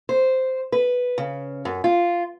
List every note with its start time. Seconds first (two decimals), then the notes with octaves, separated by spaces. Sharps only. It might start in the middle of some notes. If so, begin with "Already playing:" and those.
0.09 C5
0.72 B4
1.18 C#3
1.65 F#2
1.84 F4